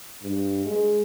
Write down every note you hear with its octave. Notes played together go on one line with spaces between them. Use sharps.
G2
G#3